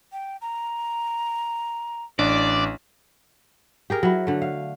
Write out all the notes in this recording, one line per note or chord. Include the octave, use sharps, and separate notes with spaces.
G5
A#5
A1 D4 D5
G4 G#4 A#4
F#3 E4
D3 A3
F5